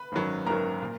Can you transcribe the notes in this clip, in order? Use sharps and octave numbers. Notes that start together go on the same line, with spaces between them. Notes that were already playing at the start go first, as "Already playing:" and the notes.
Already playing: B4 B5
G#1 F#2 D#3 F#3
G#1 F#2 D#3 F#3 A#4 A#5
A#2